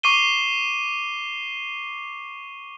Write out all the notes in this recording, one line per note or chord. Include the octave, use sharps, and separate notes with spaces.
C#6 D6 C7 D#7 G7